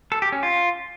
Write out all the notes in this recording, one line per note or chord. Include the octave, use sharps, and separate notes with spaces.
A4
G4
C#4
F4